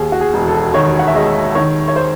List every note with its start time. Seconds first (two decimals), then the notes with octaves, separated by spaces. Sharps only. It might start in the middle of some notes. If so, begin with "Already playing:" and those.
Already playing: D#2 G#4
0.12 F#4
0.21 G#4
0.34 E1
0.48 A4
0.74 D#3 C#5
0.99 F#5
1.07 E5
1.15 G#3 D#5
1.55 D#3 C#5
1.88 C#5
1.96 C5